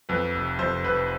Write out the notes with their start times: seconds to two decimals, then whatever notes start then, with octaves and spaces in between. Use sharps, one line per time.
0.09 F2 B4
0.34 F1
0.59 F2 C5
0.84 F1 B4